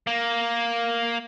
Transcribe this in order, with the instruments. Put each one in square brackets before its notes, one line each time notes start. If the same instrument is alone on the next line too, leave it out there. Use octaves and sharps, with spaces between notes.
[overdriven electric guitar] A#3